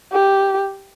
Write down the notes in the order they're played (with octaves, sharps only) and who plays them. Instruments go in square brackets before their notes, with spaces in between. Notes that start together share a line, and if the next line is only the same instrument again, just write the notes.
[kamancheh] G4